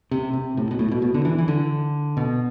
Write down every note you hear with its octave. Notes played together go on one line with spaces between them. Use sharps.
C3
C3
A2
B2
A2
B2
B2
D3
E3
E3
D3
B2